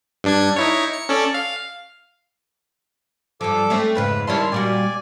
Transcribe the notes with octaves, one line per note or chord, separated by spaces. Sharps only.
G2 D4 G#6
D#4 E4 C#5
C#7
C#4 A4 D5
F5
G2 F3 A4 D6
A3 C4 C#4
F2 G#2 C#3 B4
D#3 G3 C#4 E4 A5 C6
A#2 G3 F#4 D5 G#5